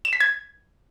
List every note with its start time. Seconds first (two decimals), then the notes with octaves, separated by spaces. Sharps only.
0.05 E7
0.13 B6
0.20 G#6